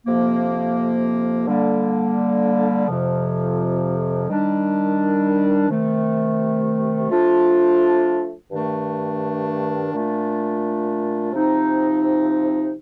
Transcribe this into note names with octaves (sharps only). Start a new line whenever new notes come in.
F2 C3 F3 A#3
D3 G3 A#3
F2 C3 F3
D#3 G3 D4
C3 D#3 A3
F3 A3 D4 F4
G2 D#3 A3 D4
A#2 A3 D4 F4
C3 F3 C4 D#4